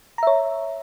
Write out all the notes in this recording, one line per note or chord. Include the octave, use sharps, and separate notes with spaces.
C#5 E5 A#5